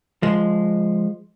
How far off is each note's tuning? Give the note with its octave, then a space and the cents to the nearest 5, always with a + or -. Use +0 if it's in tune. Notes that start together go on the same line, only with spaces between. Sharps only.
F3 +0 G#3 +0